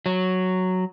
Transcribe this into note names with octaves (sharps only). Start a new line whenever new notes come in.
F#3